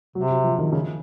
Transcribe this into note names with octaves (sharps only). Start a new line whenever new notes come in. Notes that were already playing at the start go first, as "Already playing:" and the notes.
C3 F#3
F#3
F3
D#3
C#3